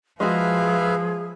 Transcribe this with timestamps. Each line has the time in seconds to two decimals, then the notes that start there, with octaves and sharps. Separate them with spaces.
0.20 F3 G#3 F#4 G#4 B4 E5 F5